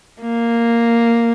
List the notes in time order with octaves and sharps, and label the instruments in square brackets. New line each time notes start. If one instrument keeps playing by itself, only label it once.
[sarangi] A#3